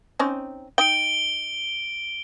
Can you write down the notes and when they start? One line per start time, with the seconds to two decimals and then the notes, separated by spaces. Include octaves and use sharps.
0.19 C4 C#4 D#4
0.78 D#4 G5 D7 G7